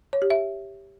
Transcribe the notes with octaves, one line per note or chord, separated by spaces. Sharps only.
C#5
G4
E5